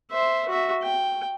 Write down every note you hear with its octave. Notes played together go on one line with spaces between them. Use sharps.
C5 E5
F#4 E5
G5